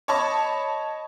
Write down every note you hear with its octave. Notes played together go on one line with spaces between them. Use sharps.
C#5 D#5 A5 B5 C#6